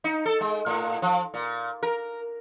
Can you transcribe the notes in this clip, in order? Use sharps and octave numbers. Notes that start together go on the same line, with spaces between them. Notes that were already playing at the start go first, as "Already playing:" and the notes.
D#4
A4
G#3
A2
F3
A#2
A#4